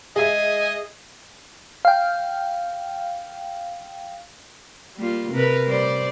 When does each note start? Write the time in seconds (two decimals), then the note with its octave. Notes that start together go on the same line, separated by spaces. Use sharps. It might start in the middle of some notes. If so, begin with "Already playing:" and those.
0.16 G#3 G#4 D#5 E5 G#5
1.85 F5 G5
4.97 G3 A#3 F4
5.32 C3 A#4 B4
5.66 G3 C5 D5